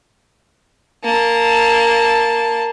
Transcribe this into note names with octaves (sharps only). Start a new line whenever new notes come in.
A#3 A5